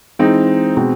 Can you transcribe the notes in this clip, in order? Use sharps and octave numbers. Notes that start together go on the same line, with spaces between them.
E3 G#3 C4 D#4
B2 G#3 C4